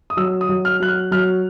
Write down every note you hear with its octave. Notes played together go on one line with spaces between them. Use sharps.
D#6
F#3 E6
D#6
F#3
F6
F#3 F#6
F6
F#3 F6